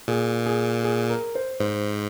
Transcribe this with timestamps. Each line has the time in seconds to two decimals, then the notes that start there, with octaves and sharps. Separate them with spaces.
0.08 A#2 G#4
0.46 G#4
0.84 G#4
1.09 A#4
1.35 C5
1.60 G#2 C5